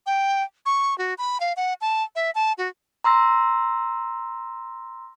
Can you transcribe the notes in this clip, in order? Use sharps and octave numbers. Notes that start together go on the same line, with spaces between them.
G5
C#6
F#4
B5
F5
F#5
A5
E5
A5
F#4
A#5 C6 E6 A#6